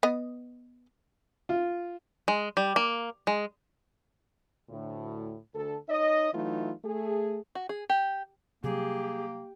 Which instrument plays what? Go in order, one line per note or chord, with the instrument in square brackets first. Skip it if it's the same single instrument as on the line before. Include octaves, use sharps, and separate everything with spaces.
[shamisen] B3 D#5
[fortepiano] F4
[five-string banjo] G#3
G3
A#3
G#3
[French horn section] D2 A2
D2 A4
D#4 C#5 D#5
E3 F#3 A3 D#4 F4
A3 G#4
[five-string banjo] F#4
G#4
G4
[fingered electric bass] C3 F#3 G3 [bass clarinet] A#3 [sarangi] G4 [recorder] G#4